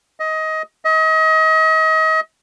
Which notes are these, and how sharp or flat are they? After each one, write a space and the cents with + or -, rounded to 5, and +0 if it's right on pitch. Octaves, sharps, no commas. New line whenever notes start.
D#5 +20
D#5 +35